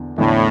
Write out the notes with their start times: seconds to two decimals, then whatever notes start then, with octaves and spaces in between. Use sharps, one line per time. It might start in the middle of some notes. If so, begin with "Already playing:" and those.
Already playing: E2 D3
0.18 E2 A2 D3 A3 E4